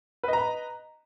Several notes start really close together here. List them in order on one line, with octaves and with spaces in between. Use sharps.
B4 D#5 A#5 B5